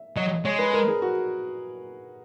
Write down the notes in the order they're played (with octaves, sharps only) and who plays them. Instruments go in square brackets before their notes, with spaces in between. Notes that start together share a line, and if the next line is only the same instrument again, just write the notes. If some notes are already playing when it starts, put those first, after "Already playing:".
Already playing: [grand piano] E5
[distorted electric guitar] F#3 [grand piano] D#5
[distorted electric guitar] G#3 [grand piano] C#5
[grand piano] B4
A#4
G#4
F#4